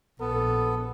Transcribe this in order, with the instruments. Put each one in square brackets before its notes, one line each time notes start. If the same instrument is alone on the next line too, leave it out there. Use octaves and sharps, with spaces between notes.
[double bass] A#1 [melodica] B3 [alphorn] A4